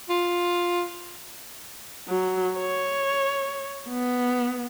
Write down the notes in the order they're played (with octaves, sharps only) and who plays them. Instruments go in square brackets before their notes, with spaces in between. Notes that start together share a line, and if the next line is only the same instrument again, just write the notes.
[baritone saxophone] F4
[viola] F#3
C#5
B3